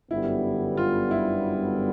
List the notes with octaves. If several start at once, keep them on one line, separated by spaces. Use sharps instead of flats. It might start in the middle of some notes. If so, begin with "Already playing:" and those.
G1 F#2 D3 G3 B3 E4
F4
E4